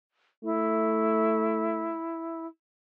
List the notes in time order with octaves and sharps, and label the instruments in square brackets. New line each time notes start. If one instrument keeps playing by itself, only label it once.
[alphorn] A3 [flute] E4